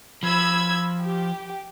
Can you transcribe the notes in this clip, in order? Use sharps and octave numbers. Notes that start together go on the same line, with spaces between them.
F3 B5 E6 G#6
G4